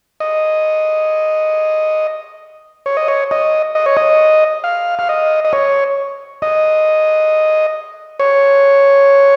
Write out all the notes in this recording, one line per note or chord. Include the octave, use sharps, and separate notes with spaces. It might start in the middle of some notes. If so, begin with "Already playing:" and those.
D#5
C#5
D#5
C#5
D#5
D#5
C#5
D#5
F5
F5
D#5
D#5
C#5
D#5
C#5